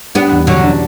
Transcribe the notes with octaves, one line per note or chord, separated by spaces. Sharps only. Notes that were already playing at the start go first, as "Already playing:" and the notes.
G3 B3 D4
E2
B2 D3 F#3
D4